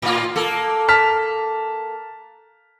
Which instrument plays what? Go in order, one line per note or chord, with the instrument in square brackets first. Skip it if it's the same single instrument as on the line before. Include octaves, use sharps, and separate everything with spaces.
[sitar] A2 F4
A#3 A4
[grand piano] A5 F6 B6